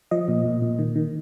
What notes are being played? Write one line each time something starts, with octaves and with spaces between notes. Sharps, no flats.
F3 D#5
A#2
A#2
A#2
D#3
D#3